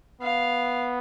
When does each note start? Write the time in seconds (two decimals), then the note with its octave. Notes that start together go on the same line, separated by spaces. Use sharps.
0.21 B3 F5